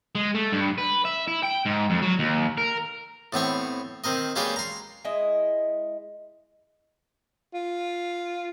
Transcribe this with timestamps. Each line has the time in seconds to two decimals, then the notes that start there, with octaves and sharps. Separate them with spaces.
0.15 G#3
0.35 A3
0.52 G2
0.78 B4
1.05 E5
1.28 E4
1.43 G5
1.66 G#2
1.90 F2
2.02 F#3
2.19 D#2
2.58 A#4
3.33 A2 B3 C4 C#5
4.04 D#3 C4 A#4 D#5
4.36 G#3 A#3 C#4 G4 B4 D5
4.56 A#5 C6
5.04 G#3 E4 D#5
7.54 F4